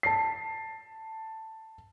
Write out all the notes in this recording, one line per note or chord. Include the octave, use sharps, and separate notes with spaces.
A5 C7